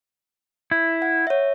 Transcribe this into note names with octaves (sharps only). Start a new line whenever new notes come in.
E4
F#5
C#5 E5